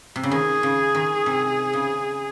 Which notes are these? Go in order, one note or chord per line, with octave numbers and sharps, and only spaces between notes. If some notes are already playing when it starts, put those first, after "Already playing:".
C3
C#3
D#3 G#4
C#3
D#3
C3
C#3